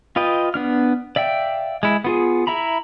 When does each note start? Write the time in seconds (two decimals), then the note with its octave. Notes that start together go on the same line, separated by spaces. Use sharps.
0.16 F4 B4 D#5 G5
0.54 B3 D4 F6
1.16 D5 E5 F5 G5
1.83 G#3 E4
2.04 B3 F4 G#4
2.47 E4 E5 A#5 B5